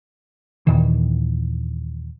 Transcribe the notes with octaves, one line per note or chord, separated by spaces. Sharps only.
D#2 A#2 D#3 E3